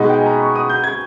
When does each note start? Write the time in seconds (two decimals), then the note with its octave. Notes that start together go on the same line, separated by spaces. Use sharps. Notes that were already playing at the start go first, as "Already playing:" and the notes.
Already playing: B2 G#3 D#4 B5
0.09 G5
0.18 G#5
0.26 A#5
0.34 B5
0.42 C#6
0.55 D#6
0.69 G6
0.84 G#6